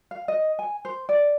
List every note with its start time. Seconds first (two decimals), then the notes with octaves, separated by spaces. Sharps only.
0.11 F5
0.28 D#5
0.59 G#5
0.85 C5
1.09 D5